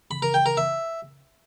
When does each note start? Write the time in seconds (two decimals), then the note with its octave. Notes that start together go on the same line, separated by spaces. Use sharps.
0.11 B5
0.22 A#4
0.34 G5
0.46 A#4
0.57 E5